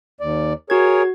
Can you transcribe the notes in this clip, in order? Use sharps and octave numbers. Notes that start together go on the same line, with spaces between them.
D#2 D5
F#4 G#4 A#4 C#5 G#6